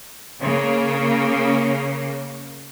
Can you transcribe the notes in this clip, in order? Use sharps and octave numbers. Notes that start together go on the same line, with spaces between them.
C#3 A#3